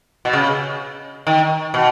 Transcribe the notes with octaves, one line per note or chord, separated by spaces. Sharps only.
B2
C#3
D#3
B2